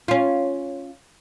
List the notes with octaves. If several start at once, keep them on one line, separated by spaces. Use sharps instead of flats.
C#4 F4